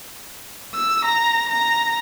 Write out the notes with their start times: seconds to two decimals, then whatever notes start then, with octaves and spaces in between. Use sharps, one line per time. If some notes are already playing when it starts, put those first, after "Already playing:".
0.75 E6
1.05 A#5
1.50 A#5